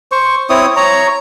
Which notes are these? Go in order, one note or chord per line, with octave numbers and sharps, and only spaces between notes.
C5 C#6
C4 E4 C#5 D#6
C#5 A#5